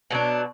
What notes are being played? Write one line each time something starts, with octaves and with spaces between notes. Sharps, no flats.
B2 F#3 D4